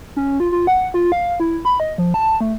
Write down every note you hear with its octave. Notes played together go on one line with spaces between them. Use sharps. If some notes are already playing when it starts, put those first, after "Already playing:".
C#4
F4
F4
F#5
F4
F5
E4
B5
D#5
F3
A5
A3